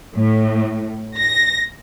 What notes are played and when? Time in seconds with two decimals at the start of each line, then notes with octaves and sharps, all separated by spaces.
0.15 A2
1.18 A#6